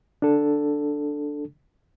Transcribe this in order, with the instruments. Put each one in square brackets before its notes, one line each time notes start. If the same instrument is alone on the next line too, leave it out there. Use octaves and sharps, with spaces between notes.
[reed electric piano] D4 A4